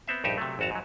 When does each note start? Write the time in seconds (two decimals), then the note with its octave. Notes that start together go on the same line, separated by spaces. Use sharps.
0.07 B3 C4 E5
0.24 A#1 G2 D#4 G4 E5
0.38 C3 F#3 A3
0.59 G#1 F2 F#4 A5 A#5
0.71 G#2 F#3